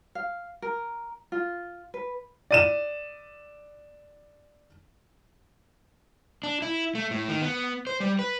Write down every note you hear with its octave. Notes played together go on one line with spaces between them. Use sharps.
F5
A#4
F4
B4
D5 D#7 E7
D4
E4
A3
A2
D#3
B3
C5
G3
B4